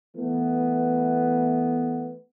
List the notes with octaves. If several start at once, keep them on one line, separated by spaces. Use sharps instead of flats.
E3 A3 B3